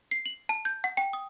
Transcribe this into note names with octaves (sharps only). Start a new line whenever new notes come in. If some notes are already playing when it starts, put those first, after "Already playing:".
C7
F#7
A5
G6
F#5
G5
D#6